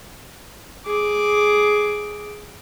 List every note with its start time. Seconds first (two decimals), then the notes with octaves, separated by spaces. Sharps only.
0.86 G#4 D6